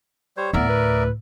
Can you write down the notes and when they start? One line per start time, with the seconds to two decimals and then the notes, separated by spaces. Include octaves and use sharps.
0.37 G3 C5 C#5
0.53 D2 A2 B3 A#4 D5 E5
0.69 B4